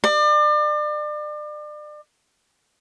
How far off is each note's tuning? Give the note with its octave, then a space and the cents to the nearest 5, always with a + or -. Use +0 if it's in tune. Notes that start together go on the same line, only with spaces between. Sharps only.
D5 +35